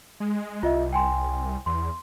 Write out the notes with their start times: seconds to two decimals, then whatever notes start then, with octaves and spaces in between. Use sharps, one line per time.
0.20 G#3
0.63 C2 F4 D#5 E5
0.93 G5 G#5 C6
1.66 E2 C6